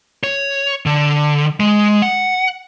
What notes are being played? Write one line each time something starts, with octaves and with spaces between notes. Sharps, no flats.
C#5
D3
G#3
F#5